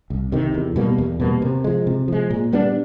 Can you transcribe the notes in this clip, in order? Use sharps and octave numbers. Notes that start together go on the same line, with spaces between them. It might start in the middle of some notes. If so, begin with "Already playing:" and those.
C2
C3 D#3
E2
B2 G3 A#3
E2
B2 G3 A#3
C3
F3 G#3
C3
F3 G#3
A#2
G3 B3 D4